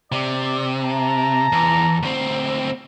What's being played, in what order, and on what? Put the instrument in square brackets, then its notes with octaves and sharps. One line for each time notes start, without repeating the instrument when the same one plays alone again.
[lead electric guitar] C3 [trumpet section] D5
[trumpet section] A5 A#5
[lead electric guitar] E2
D2 C4